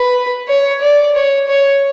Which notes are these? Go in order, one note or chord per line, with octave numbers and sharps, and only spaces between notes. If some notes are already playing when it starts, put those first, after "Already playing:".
Already playing: B4
C#5
D5
C#5
C#5